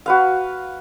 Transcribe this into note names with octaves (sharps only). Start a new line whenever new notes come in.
F#4 B4 F5